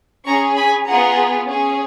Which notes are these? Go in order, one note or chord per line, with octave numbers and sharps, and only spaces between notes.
C#4 G#4 A#5 C#6
G#5 B5
B3 F4 G#4 F#5 A#5
C#4 G#4